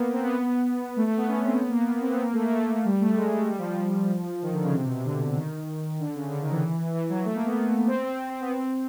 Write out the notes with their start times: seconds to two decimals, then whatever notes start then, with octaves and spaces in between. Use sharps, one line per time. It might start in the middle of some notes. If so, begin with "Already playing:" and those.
Already playing: A#3 B3
0.13 C4
0.23 B3
0.97 A3
1.07 A3
1.17 B3
1.28 C#4
1.44 C4
1.59 B3
1.69 A#3
1.80 B3
1.91 B3
2.01 C4
2.11 B3
2.22 A#3
2.33 A3
2.43 A#3
2.54 A3
2.85 G3
3.01 A3
3.16 G#3
3.32 G#3
3.48 G3
3.58 F3
3.69 F3
4.42 D#3
4.53 D3
4.63 C#3
4.73 C3
4.84 B2
4.94 C3
5.05 D3
5.36 D#3
6.00 D3
6.15 C#3
6.30 D3
6.41 D#3
6.51 E3
6.94 E3
7.09 F#3
7.25 A3
7.35 A#3
7.46 B3
7.57 B3
7.87 C4
8.04 C4
8.29 C4
8.41 B3
8.51 C4